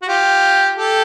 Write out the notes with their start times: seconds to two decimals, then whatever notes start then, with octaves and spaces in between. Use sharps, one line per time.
0.02 F#4
0.08 F4 G4
0.77 G4 A4